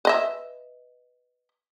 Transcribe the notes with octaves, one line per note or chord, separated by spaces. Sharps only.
B4 D#5 E5